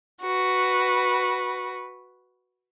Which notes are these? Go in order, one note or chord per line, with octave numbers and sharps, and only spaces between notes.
F#4 B4